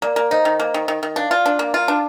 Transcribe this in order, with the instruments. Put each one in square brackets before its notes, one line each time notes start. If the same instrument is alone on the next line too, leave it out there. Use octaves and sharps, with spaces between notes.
[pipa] A#3 [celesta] A#4 D5
[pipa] A#3
[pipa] D#4 [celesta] C5 D#5
[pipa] D#3
A#3
D#3
D#3
D#3
[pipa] D4 [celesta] D5 F5
[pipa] F4
D4
A#3
F4
D4